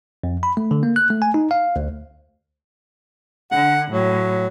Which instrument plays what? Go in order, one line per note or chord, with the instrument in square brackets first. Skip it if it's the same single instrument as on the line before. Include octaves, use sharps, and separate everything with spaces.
[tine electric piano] F2
B5
A3
D3
A#3
F#6
A3
G#5
D#4
F5
D2
[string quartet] D3 [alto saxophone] F#5
[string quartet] A2 [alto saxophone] F#3